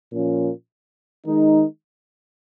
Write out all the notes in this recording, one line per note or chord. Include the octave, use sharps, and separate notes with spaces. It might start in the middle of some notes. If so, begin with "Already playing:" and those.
A#2 F3 A#3 C#4 F4
D#3 G#3 D#4